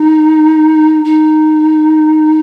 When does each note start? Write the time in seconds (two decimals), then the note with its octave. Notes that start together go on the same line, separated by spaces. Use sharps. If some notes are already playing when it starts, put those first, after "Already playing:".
Already playing: D#4
1.05 D#4